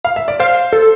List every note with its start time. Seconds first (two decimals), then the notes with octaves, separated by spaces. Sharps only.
0.05 F5
0.16 E5
0.28 D5
0.40 C5 F5
0.73 A4